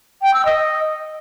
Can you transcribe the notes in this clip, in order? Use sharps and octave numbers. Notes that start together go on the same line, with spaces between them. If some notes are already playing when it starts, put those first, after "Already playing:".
G5
E6
D#5